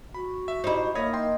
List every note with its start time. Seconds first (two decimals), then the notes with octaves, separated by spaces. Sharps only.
0.14 F#4 B5
0.48 E5
0.64 D#4 E4 G4 C5
0.95 A#3 C#5 D#5 B5 G#6
1.13 G5 C6